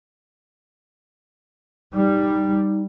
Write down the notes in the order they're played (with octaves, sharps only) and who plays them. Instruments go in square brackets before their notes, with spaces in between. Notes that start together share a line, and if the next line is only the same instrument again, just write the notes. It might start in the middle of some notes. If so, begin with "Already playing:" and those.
[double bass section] G3 [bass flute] D#4